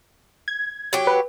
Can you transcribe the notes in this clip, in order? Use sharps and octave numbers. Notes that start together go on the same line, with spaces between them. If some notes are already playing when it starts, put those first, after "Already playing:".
G#6
F#3 G4
B4